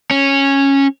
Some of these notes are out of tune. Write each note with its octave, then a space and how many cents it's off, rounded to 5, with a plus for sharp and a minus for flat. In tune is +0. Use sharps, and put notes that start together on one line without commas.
C#4 -10